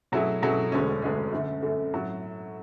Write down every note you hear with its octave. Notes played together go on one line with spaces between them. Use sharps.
B2 F#3 A3 E4 G#4
B2 F#3 A3 E4 G#4
E1 D2 D3 G#3 C#4
E1 D2 D3 G#3 C#4
F#2 D3 A3
F#2 D3 A3
A2 F#3